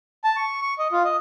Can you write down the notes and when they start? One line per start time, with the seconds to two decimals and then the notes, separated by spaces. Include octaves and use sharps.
0.24 A5
0.36 C#6
0.62 C#6
0.79 D#5
0.92 F4
1.04 D#5